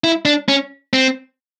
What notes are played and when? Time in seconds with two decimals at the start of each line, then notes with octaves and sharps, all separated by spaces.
0.04 E4
0.25 D4
0.48 C#4
0.93 C4